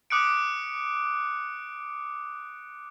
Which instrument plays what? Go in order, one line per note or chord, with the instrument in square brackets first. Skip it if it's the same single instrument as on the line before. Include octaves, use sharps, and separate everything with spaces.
[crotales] D6 D#6 F#6 C#7 D7